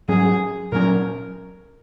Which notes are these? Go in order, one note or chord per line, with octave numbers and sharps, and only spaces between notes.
G#2 F#3 C#4 G#4
A#2 F#3 C#4 A#4